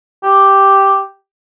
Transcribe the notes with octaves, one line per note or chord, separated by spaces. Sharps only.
G4